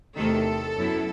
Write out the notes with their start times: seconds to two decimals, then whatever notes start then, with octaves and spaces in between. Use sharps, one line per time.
0.15 E2 C3 D#3 A3 A4
0.76 F#2 F#3 B3 E4